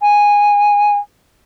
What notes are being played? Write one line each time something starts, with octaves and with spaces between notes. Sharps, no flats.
G#5